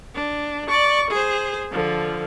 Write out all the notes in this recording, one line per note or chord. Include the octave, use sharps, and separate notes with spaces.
D4
D5 C#6
G#4 C5
D3 F3